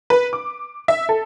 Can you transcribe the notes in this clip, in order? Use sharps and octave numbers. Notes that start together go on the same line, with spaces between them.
B4
D6
E5
A4